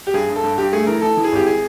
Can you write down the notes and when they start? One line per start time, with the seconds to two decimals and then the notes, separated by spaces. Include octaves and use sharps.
0.07 G4
0.14 G2 G#4
0.29 G2
0.36 A4
0.43 G2
0.58 G2 G4
0.72 A3 G#4
0.87 E3 A#4
1.02 E3 A4
1.17 E3
1.24 G#4
1.32 G#1 G4
1.46 G#4